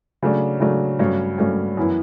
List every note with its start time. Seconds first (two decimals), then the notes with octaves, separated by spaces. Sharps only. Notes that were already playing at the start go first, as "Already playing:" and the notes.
0.22 C#3 F#3 A3 D4
0.60 C#3 F#3 A3 D4
0.99 G2 F#3 A3 C#4
1.38 G2 F#3 A3 C#4
1.77 F#2 E3 B3 E4